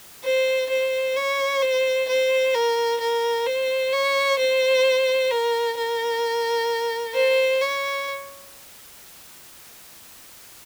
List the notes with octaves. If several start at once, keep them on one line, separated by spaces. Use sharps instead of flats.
C5
C5
C#5
C5
C5
A#4
A#4
C5
C#5
C5
A#4
A#4
C5
C#5